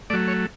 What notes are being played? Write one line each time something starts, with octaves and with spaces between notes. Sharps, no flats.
F#3 A3 D5
C#5